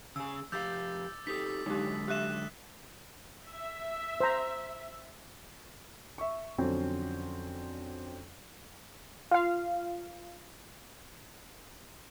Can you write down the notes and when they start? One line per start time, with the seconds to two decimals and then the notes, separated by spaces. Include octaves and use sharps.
0.16 C#3 G#4 E6
0.52 F2 G4 F5 D6 E6 G6 A6
1.27 D#4 G4 A4 D#6 B6
1.66 D3 F#3 G#3 D#4 G4
2.08 G4 E5 E6 F#6 E7
3.48 E5
4.20 C5 A#5
6.18 E5 C#6
6.58 F2 D3 F#3 C4 C#4
9.31 F4 F5